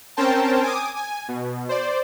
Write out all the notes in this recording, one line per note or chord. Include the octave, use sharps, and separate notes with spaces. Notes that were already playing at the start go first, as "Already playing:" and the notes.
C4 C#4 A#4 C5 G5 A5
G#5 D6 D#6
G#5
B2
C5 D5